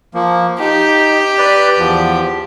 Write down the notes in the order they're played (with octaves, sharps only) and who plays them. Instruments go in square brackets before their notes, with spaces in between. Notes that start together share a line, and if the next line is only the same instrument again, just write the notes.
[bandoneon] F3 A#3
[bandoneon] D#4 [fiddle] G4
[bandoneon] B4 D5
E2 F3